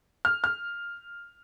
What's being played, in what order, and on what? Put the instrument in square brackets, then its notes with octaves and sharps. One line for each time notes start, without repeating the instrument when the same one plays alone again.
[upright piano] F6
F6